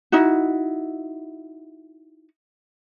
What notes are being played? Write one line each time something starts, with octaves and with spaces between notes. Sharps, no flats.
D#4 E4 F#4